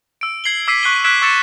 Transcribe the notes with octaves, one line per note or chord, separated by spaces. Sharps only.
E6 D7
G#6 C7 F#7 G7
D6 E6 B6 C7 D#7
C#6 F#6 B6 C7 D#7 G7
E6 F#6 G#6 B6 D7 E7
C#6 E6 A6 C#7 E7